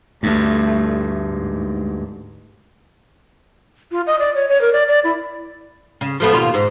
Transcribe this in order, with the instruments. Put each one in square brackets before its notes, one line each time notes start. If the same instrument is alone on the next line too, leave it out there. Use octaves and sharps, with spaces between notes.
[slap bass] D2 G2 [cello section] G3 A3
[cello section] G#2
[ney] F4
D#5
D5
C#5
C#5
A#4
D5
D5
E4
[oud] C#3
F3 A3 B3
D#2 B2 F4
G#2